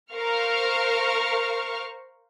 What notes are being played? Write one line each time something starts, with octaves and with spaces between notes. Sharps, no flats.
A#4 C5 F5 C#6 F6